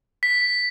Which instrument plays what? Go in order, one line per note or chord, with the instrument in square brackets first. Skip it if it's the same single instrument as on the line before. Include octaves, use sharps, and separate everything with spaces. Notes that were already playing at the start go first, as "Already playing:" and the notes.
[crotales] B6